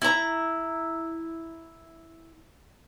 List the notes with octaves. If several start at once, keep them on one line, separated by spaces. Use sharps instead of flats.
E4 A#5